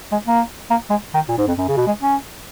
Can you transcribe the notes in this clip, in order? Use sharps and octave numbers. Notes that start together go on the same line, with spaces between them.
G#3
A#3
A#3
G#3
D#3
A#2
G#2
F2
F#2
C#3
B2
G#3
C#4